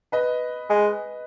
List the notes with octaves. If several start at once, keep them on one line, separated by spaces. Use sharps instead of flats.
B4 D#5
G#3